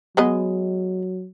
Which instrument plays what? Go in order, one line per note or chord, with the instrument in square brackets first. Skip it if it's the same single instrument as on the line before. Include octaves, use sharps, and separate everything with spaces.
[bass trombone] F#3 [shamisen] G#3 B3 D#5